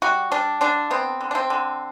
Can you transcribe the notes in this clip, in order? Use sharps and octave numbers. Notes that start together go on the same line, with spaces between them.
G3 F#4
G3 D4
D3 D4
B3 C4
D3
D4
C4
D3